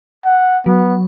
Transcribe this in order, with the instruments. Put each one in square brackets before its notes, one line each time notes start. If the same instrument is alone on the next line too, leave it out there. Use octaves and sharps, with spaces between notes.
[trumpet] F#5
[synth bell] F#3 [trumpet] B3